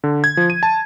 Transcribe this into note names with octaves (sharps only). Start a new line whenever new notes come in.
D3
G#6
F3
D#7
A5